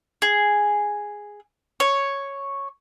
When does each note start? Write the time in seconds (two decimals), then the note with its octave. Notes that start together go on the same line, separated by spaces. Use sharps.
0.22 G#4
1.80 C#5